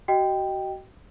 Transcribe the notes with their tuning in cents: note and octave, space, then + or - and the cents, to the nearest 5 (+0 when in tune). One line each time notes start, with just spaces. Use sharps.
F#4 +35 D#5 +0 G5 +0